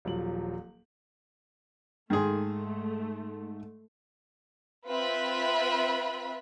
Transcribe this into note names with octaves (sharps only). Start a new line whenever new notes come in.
D#1 F3 F#3 F#7
G#2 D#3 A3 G#4 C6
C4 F4 B4 E5 B5